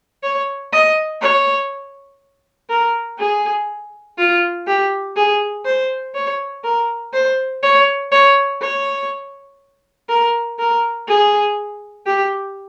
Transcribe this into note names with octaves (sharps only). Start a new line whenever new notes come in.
C#5
D#5
C#5
A#4
G#4
F4
G4
G#4
C5
C#5
A#4
C5
C#5
C#5
C#5
A#4
A#4
G#4
G4